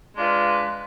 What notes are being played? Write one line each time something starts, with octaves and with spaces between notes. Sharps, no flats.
G#3 D4 F4 B4